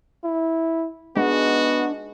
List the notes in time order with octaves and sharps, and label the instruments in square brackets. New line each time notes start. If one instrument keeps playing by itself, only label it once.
[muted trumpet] E4
[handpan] G#3 [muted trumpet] B3 [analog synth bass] D4 [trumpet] F#4